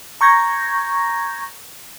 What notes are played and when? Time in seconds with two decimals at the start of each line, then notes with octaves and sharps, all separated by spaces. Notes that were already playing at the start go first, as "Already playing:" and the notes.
0.21 A#5 C#6 G6 G#6 A#6